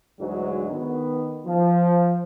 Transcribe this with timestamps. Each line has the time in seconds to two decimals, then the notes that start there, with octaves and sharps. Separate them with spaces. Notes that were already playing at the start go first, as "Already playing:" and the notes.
0.20 D2 G#2 E3 F#3 G#3
0.71 D#3 B3
1.46 F3